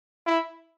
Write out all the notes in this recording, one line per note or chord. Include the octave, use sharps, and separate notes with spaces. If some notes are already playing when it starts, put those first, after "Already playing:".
E4